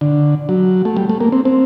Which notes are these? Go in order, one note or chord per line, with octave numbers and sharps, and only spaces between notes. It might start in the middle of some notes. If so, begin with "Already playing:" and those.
D3
F#3
A3
G3
A3
A#3
C4
C4